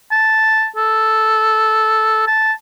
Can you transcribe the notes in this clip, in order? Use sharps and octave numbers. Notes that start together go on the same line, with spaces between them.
A5
A4
A5